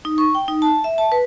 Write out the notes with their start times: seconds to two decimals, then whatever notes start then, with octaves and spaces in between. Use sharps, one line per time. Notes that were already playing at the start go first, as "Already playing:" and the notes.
0.05 D#4
0.18 C#6
0.35 G5
0.48 D#4
0.62 A5
0.84 E5
0.98 A5
1.12 B4